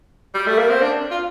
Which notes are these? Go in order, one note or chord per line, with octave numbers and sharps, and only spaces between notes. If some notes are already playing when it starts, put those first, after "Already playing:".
G3
A3
A#3
C4
D4
F4